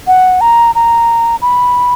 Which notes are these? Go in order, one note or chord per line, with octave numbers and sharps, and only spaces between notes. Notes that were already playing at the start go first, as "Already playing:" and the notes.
F#5
A#5
A#5
B5